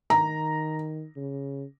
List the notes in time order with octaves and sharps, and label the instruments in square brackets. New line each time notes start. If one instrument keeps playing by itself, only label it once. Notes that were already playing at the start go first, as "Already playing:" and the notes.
[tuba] D#3 [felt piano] A#5
[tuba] C#3